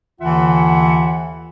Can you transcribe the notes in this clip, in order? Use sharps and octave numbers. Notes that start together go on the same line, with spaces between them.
D#2 D3 E3 F4 E5 F#5